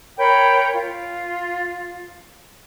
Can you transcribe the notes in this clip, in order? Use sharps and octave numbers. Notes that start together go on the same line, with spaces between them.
A#4 C#5 G5 B5
F4